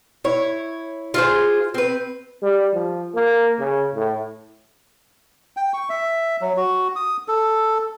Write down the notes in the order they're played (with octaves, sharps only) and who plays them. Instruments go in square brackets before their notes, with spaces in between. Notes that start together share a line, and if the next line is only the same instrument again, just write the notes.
[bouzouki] E4 C#5
F4 G#4 C5
C4 B4
[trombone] G3
F3
A#3
C#3
A2
[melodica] G5
C#6
E5
F#3
F#4
D#6
A4